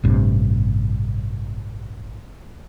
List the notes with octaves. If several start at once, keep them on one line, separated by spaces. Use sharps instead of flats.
A1 G2 C3